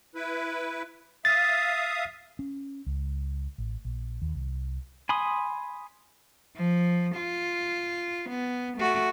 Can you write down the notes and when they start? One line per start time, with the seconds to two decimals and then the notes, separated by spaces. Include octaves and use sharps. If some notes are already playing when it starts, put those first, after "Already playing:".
0.15 E4 B4
1.25 E5 F5 D#6 A6
2.39 C#4
2.86 C#2
3.58 A1
3.85 A#1
4.22 D#2
4.35 C2
5.09 G#5 B5 C6 D#6
6.56 F3
7.17 F4
8.30 B3
8.78 A3 F#4